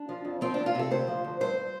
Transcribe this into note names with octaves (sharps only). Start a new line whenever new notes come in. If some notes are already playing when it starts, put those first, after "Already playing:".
Already playing: D4
F3
F2
F3 C4
D2 D4
F4
C3 A4
D2 C5
F3
D2
G2 C5